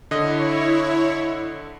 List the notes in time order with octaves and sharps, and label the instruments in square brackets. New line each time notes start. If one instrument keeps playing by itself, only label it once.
[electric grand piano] D3 D#5 [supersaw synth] E4 C#5